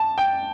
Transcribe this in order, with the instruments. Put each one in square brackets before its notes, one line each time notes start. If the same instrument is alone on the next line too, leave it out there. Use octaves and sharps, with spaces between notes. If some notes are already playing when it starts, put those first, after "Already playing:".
Already playing: [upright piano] A5
G5